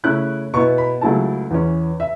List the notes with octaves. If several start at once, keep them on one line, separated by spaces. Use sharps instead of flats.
C#3 A3 C#4 E4 F#6
B2 B3 E4 C#6
B5
C#2 C#3 F#3 A3 E4 A5
E2 E3 C#4
E5